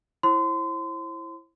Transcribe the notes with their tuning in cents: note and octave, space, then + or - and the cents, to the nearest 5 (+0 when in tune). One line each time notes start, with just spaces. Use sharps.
E4 +10 C5 +40 C6 -30